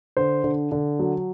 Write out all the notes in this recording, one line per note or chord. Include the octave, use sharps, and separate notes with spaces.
D3 C5
D3
D3
F#3